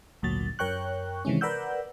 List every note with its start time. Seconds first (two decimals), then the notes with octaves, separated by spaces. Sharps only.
0.22 G#1 D2 A#2 F#3 A6
0.59 F#2 A#4 C#5 G5 C#6 F#6
1.25 C3 D#3 E3 G#3 C#4
1.41 A#4 B4 D5 F#5 E6 G6